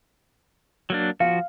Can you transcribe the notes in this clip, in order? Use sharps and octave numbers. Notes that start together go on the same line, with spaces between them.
F#3 A#3 D4
F3 F#4 F5